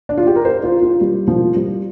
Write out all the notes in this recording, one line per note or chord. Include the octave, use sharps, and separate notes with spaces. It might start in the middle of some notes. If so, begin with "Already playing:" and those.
D4
F4
G4
A#4
C5
F4
F4
G3
F3
G3